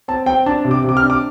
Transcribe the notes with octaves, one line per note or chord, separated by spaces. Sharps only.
C4 A5
C4 G5
D4 A5
C3
D6
C3 D6
F6
D4
D6